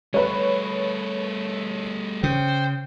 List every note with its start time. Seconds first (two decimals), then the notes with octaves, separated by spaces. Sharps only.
0.14 G3 A3 B4 C#5
2.23 C#3 C5 G5